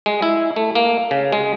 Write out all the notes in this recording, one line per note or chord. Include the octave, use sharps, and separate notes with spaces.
G#3
E4
A3
A#3
C#3
G#3